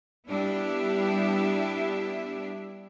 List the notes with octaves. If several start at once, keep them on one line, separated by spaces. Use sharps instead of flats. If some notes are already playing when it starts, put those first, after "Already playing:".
G3 B3 D4 E4 G4 E5